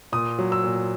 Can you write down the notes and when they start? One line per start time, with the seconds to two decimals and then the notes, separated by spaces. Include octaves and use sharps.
0.12 A#2 D#6
0.38 F#3
0.52 E6
0.64 A#2